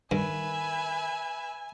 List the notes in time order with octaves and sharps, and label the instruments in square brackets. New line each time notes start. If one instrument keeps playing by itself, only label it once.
[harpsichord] G2 [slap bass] D#3 [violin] B4 E5 [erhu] G#5